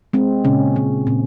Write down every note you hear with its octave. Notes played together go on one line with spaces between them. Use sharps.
G#3 C4
A#2 C#3 C#4
G#3 C4
A#2 C4